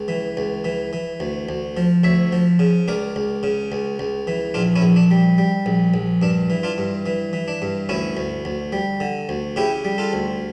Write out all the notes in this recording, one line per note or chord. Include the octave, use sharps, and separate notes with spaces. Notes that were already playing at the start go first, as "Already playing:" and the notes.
Already playing: C#2
E3
C#2
E3
E3
D2
D2
F3
D2 C#5 E5
F3
C#3
C#2 A#4 D5
C#2
C#3
C#2
C#2
E3
A#1 D4 F4
C#4 E4
A#1
D4
G3
G3
A#1
A#1
G2 D4
E3
D4 F4
G2
E3
E3
D4
G2
D2 C#4 E4
D2
D2
G3
D3
D2
C#3 E4 G4
G3
F4 A4
D2